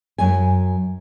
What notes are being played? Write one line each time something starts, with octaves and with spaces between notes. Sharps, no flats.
F#2 G#5